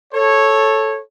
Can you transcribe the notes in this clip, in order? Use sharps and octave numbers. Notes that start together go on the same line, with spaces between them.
A4 C#5